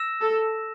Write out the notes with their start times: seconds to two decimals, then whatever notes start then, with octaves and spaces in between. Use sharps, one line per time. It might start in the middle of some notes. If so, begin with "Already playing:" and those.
Already playing: E6 A#6 E7
0.21 A4